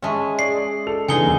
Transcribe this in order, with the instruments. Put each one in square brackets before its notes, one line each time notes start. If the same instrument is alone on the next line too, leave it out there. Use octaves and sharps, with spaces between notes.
[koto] G#3 C#4 [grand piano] E5 A5 C#6
[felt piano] G#4 D5 [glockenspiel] C7
[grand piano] A4 A5 F7
[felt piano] D3 E3 [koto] G#3 D#4 G#4 [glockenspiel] G#5 C#7 G7
[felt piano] E1 A#3